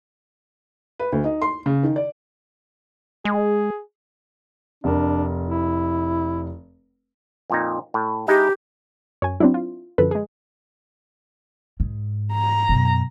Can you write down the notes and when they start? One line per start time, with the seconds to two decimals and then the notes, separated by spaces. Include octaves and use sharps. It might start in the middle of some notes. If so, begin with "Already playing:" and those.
0.99 B4
1.12 D2
1.24 D#4
1.42 C6
1.66 C#3
1.83 D#3
1.96 D5
3.25 G#3 G#4
4.84 F1 D4 A#4
5.48 E4
7.50 F2 A#2 D#4
7.94 A2
8.28 G#3 D#4 E4 G4
9.22 F#2 C#5 G#5
9.40 F#3 C4 D4 E4
9.54 F4
9.98 F#2 D3 F3 A4 B4
10.11 G#3 G#4
11.80 G#2
12.34 A#5
12.69 F#2 B2